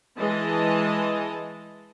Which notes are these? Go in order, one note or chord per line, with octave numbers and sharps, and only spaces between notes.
E3 G#3 D#5 A5